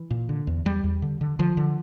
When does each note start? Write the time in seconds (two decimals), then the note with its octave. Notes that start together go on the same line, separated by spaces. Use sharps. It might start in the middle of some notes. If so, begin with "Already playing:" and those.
Already playing: E3
0.10 A#2
0.29 D3
0.47 E2
0.65 E2 G3
0.84 E2
1.02 D3
1.21 D3
1.39 D3 F3
1.57 D3